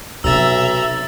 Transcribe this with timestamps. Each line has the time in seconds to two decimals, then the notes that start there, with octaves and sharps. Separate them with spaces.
0.24 B1 C3 E5 A#5 E6 A6